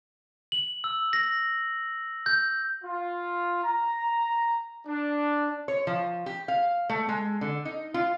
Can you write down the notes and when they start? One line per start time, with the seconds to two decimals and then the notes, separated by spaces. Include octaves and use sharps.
0.52 F#7
0.84 E6
1.13 A#6
2.26 G6
2.84 F4
3.64 A#5
4.87 D4
5.68 C#5
5.87 F3
6.26 G4
6.48 F5
6.90 A3
7.09 G#3
7.41 D3
7.65 D#4
7.94 F4